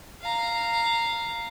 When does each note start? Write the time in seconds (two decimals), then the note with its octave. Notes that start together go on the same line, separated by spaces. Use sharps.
0.22 F5 A#5